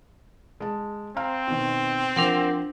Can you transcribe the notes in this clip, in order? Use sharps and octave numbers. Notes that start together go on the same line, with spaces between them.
G#3 A5
C4 F5 A#5 F6
B2 D#3
F3 D4 A#4 F#5